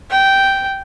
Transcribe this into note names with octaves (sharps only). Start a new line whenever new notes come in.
G5